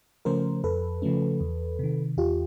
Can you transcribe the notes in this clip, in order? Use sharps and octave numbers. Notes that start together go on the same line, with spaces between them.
C#3 F3 A3 C#4 A#4 C5
F2 A4 B4
C#3 F3 A3 C#4
E2
C3 D#3
E2 F4 G4